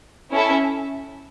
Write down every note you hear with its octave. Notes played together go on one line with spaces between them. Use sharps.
C#4 E4 A4 E5